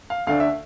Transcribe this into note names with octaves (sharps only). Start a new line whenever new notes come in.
F5
D2 D3 A3 D4 F5
E5